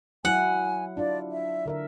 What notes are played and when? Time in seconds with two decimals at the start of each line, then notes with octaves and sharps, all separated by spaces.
0.25 F#3 E4 F#5 G#5
0.97 D4 E4 F4 D5
1.31 E5
1.66 D3 A#4 E5